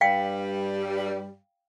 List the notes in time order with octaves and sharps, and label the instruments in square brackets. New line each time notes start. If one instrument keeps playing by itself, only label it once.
[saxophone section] G2 G3 [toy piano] F5 G5